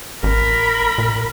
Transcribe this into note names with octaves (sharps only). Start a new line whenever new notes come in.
A1 A#4 B5
A#2